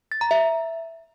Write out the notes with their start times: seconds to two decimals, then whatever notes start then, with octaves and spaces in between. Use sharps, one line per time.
0.12 A6
0.21 A#5
0.31 E5